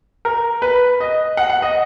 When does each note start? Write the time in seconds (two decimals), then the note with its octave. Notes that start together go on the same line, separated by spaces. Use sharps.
0.25 A#4
0.62 B4
1.00 D#5
1.37 F#5
1.50 F#5
1.62 D#5